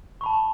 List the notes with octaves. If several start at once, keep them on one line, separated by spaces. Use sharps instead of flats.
A5 B5 C#6